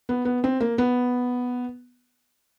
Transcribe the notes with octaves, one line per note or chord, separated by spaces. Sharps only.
B3
B3
C4
A#3
B3